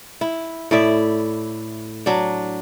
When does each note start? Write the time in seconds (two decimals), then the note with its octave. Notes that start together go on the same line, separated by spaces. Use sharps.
0.21 E4
0.71 A2 E4 D5 E5
2.06 F#3 D4